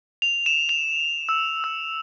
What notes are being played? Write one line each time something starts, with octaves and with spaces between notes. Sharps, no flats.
F7
E7
F7
E6
E6